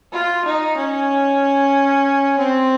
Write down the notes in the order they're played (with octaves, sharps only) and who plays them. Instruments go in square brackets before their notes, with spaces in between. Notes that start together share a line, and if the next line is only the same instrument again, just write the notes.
[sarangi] F4
D#4
C#4
C4